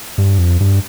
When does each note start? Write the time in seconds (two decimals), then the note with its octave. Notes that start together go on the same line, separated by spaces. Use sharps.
0.18 G2
0.38 F2
0.60 G2